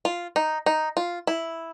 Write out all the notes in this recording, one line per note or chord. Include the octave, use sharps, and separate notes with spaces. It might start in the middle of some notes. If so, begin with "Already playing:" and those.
F4
D#4
D#4
F4
E4